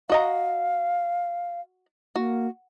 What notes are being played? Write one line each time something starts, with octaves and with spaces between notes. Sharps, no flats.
F#4 D#5 F5 A#5
A#3 F#4